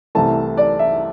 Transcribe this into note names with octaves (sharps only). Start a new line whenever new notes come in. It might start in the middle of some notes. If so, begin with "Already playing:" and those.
C2 C3 E3 A3 A5
D5
E5